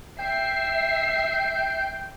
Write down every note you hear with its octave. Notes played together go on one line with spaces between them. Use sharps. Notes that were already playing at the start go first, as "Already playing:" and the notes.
E5 G5 C7